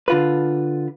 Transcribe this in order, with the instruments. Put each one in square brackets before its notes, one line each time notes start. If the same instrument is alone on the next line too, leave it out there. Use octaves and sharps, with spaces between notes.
[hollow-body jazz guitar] D3 F4 B4